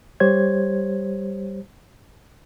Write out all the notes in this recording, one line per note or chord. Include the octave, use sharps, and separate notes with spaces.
G3 G4 C5 C#5 G#6